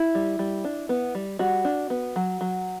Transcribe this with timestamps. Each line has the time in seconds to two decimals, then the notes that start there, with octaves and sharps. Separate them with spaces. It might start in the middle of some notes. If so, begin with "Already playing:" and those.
Already playing: E4
0.15 G3
0.39 G3
0.64 D4
0.89 B3
1.15 G3
1.39 G3 F#4
1.64 D4
1.90 B3
2.16 F#3
2.41 F#3